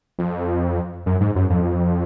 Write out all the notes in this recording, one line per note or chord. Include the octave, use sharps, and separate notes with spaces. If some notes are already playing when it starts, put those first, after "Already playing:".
F2
F#2
G#2
F#2
F2